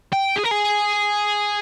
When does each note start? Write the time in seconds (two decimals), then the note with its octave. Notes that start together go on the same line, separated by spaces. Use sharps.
0.13 G5
0.36 G#4
0.44 A#4
0.51 G#4